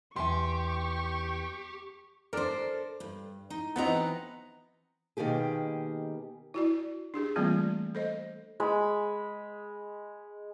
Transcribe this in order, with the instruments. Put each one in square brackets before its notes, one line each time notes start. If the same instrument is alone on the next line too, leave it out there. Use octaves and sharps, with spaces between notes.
[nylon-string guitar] E2 E5 G#5 [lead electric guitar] G4 [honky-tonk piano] C6 [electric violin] C#6
[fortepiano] D4 A#4 [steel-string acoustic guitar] A4 C5
[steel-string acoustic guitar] G2
D#4
[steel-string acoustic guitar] E3 F#5 A#5 [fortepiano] B3 C4 D#4
[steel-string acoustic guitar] B2 D#3 A#3 G4 G#4
[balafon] E4 F#4 D5
D4 G4 G#4
E3 G3 A3 A#3 C4 F4
A4 C5 D#5
[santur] G#3 B5